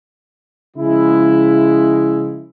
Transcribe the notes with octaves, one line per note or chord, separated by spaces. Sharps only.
C#3 F3 G#3 E4